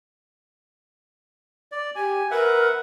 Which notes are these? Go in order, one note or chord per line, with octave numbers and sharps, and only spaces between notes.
D5
G4 G#5
A#4 B4 E5 F#5